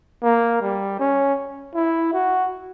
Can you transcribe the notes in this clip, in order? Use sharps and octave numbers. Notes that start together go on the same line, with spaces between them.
A#3
G3
C#4
E4
F#4